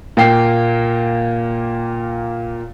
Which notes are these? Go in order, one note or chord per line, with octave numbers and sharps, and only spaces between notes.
A#2 A#3 G5 C7